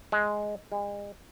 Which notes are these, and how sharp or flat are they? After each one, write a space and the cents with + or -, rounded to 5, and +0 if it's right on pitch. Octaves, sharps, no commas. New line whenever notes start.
G#3 +5
G#3 -40